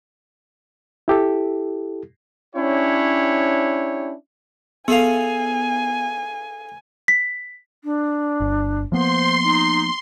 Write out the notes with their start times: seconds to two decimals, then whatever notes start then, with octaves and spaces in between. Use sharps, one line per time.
1.08 E4 G4 A4
2.55 C#4 D4 E4 G4 C#5
4.88 B3 G#4 A4 F5 G#5
7.08 B6
7.83 D4
8.40 G1
8.92 F3 A#3 B3 C5 C6
9.43 D#4